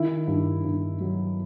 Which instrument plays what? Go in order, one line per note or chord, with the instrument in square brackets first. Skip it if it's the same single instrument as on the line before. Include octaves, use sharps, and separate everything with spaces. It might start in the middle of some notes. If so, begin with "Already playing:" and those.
Already playing: [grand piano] D#3 E4
G2
G2
F#3